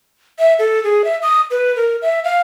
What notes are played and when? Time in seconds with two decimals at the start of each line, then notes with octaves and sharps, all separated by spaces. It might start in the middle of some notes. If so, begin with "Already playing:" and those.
0.39 E5
0.59 A4
0.84 G#4
1.05 E5
1.23 D#6
1.51 B4
1.76 A#4
2.02 E5
2.24 F5